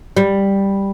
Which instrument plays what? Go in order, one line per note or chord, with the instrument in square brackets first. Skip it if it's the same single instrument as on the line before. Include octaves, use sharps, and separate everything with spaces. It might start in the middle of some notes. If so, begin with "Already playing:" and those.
[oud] G3